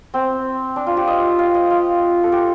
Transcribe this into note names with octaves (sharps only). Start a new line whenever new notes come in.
C4
D4
F4
G4
D#5
F5
D#5
F4
A4
G4